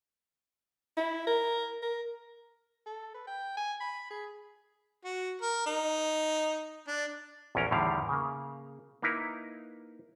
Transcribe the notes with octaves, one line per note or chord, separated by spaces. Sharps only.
E4
A#4
A#4
A4
B4
G5
G#5
B5
G#4
F#4
A#4
D#4
D4
A#1 E2 C#4 A#4 A#5
E2 A2 D3 D#3 G3 F5
C#3 A#3
A#3 D#4 E4 B4 A#5